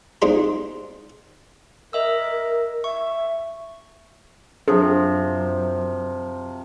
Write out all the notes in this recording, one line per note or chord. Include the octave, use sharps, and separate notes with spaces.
G#3 C4 D4 D#4 F4 G4
A#4 D#5 E5 E6
E5 C#6
F#2 C3 F3 F#3 D4 G#4